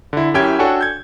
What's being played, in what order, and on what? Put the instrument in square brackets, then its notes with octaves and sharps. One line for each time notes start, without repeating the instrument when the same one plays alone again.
[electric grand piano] D3 E4
F#2 C#4 E4 G4 G5 G#6
D4 F#4 A4 C#5 G5 G#5
G6 G#6